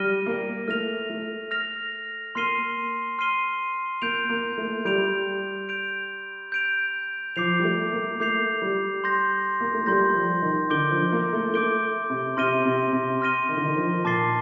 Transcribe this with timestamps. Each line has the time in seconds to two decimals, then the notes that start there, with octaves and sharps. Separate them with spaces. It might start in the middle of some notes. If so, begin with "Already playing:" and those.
Already playing: G3 F6 A#6 D#7 G7
0.26 A#3
0.68 A3 F6 A#6 F7
1.10 A3
1.51 F6 A#6 F7
2.35 A#3 C6 F6 C7 D#7 G7
3.18 C6 F6 C7 D#7 G7
4.02 A#3 G6 D7 F7
4.29 A#3
4.58 A3
4.85 G3 G6 D7 F7
5.69 G6 D7 F7
6.52 G6 D7 F7
7.36 F3 D6 G6 C7 F7
7.59 G3
7.64 A3
7.92 A#3
8.20 A3 D6 G6 C7 F7
8.62 G3
9.04 C6 G6 A#6
9.60 A#3
9.74 A3
9.86 G3 C6 G6 A#6
10.14 F3
10.42 D#3
10.70 D3 D6 G6 D7 G7
10.91 F3
11.12 A#3
11.33 A3
11.54 A3 D6 G6 D7 G7
12.10 C3
12.37 C3 C6 F6 A#6 D#7 G7
12.65 C3
12.93 C3
13.21 C6 F6 A#6 D#7 G7
13.49 D#3
13.57 D3
13.65 D#3
13.76 F3
14.05 A#2 A5 D6 A6 C7 G7